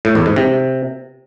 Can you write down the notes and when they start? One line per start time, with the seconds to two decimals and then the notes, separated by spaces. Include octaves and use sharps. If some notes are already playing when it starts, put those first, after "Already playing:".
0.05 A2
0.15 E2
0.26 G#2
0.36 C3